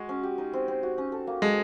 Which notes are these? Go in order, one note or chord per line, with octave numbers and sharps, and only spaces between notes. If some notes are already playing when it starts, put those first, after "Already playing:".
Already playing: G#3 F#4
C#4
G4
D#4
C4
C4
F#4
C#4
A4
A#3
G#3 A4